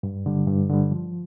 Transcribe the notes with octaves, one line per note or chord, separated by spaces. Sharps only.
G2
D3 G3
G2
D3 G3
F3